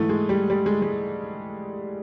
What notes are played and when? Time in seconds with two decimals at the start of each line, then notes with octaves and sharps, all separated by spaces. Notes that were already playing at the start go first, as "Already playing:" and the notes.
Already playing: G#2 E3 A3
0.09 G#3
0.29 G3
0.50 G3
0.66 G#3
0.82 G#3